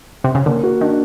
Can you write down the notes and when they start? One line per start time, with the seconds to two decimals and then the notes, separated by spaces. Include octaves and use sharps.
0.24 C3
0.35 C#3
0.46 D3 A#3
0.63 F#4
0.81 D#3 D4